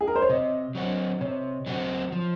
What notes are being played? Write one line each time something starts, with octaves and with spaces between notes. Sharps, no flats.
G#4
A#4
C5
C#5
C3 D#5
F#3 C4 F#4
C3 C#5
F#3 C4 F#4
F3